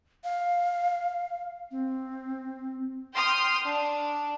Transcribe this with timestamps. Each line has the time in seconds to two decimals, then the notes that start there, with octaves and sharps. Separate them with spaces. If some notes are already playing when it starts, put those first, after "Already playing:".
0.24 F5
1.71 C4
3.13 G5 C6 D#6 F6
3.64 D4